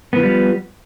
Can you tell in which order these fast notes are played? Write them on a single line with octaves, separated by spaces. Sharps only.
B3 E3 F3 G3